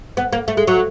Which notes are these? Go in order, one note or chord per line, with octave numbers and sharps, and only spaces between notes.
B3
A#3
A3
G#3
F#3